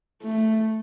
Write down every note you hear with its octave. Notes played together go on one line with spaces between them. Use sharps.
A3